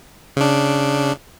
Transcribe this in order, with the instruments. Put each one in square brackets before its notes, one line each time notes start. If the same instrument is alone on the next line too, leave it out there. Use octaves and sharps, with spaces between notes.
[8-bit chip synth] C#3 D4